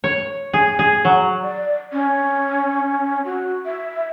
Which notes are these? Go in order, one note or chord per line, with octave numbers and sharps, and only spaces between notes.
C#5
G#4
G#4
F#3
D5
C#4
F#4
E5